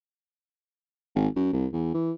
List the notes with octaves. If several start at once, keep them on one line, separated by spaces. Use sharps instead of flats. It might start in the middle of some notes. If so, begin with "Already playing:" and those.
G#1
F#2
C2
E2
E3